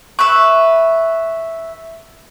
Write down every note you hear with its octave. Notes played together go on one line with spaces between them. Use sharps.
B4 E5 C#6